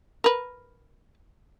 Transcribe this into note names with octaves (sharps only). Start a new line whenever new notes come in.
A#4 B4